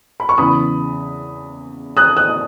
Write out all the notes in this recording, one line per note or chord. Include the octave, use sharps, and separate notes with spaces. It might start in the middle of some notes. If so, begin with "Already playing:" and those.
B5
C#6
E2 C#3 E3 B5 D#6
D#6 F#6
D#6 F#6